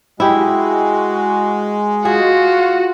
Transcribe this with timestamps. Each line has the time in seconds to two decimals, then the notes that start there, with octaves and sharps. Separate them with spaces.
0.20 G#3 E4 F#4 G4
2.05 F4 F#4 G#4